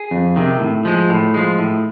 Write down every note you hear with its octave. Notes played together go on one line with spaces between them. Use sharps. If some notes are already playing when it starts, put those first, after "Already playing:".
Already playing: G#4
F2
C3 D#3
A2
F3 G#3
A2
F3 G#3
A2